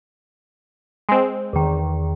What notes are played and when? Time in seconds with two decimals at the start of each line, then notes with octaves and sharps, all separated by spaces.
1.09 G#3 C4
1.53 E2 D#3